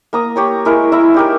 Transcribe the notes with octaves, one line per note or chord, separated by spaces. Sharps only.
A#3 A#5 D#6
G4 C#5 A#5
G#3 E4 A#4
E4 E5 A#5
D#4 G4 A#4